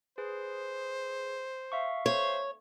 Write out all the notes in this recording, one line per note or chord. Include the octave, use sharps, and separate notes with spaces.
G#4 B4 C5
E5 F5 C#6
C5 C#5